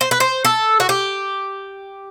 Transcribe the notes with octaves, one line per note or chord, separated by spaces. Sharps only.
C5
B4
C5
A4
F#4
G4